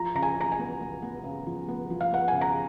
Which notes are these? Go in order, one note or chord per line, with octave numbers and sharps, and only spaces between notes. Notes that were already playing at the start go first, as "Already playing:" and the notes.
Already playing: F3 A#5
C#3 A#5
G#5
C#3 A#5
G#5
B3
B3
B3
C#3
F3
B3
F3
F5
B3 F#5
G#5
C#3
A#5